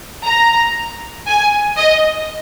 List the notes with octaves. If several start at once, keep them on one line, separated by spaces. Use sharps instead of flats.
A#5
G#5
D#5